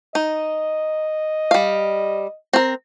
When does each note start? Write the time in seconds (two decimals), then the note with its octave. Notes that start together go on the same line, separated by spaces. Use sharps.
0.15 D#4 D#5
1.51 G3 F5
2.53 C4 A#4